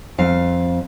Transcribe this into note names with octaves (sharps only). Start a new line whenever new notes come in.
F2 F5